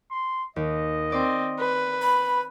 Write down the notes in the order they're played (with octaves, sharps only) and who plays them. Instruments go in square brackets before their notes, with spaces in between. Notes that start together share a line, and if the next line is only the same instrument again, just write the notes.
[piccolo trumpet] C6
[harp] D#2 [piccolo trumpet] D#5
[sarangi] C4 [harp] D5 C6 D6
[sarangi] B4
[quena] B5